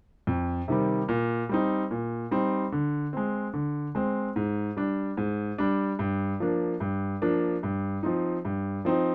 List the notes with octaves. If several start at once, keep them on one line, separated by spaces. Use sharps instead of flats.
F2
C3 D#3 G3
A#2
G3 C4 D#4
A#2
G3 C4 D#4
D3
G#3 C4
D3
G#3 C4
G#2
G3 D4
G#2
G3 D4
G2
F3 A#3 D4
G2
F3 A#3 D4
G2
F3 C4 D#4
G2
F3 C4 D#4